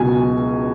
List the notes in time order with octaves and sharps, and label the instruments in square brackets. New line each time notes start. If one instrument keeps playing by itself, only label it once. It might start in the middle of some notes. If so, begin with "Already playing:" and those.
Already playing: [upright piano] C#2 B2 F#3 G#5